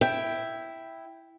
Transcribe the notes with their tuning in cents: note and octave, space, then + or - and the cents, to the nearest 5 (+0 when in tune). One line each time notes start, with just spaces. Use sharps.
E4 +0 E5 +0 G5 +0